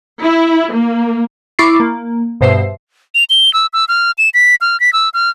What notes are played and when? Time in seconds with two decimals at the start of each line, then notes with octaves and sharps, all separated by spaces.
0.24 E4
0.74 A#3
1.59 E4 B5 C#6 D6 A6 C7
1.80 A#3
2.41 G2 B2 C5 E5 C7
3.15 F7
3.30 G7
3.54 E6
3.73 E6
3.88 F6
4.18 E7
4.34 B6
4.61 F6
4.80 B6
4.93 E6
5.14 F6